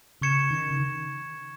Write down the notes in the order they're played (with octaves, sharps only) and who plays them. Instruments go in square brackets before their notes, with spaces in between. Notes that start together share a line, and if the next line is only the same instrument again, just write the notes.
[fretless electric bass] C#3 [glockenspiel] C#6 G#6 C#7 E7
[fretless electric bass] D#3
C#3
D#3